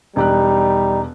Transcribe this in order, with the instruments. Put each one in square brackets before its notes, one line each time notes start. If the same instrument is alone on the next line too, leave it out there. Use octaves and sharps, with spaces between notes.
[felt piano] E1 G4 F#6 [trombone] G3 [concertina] D#4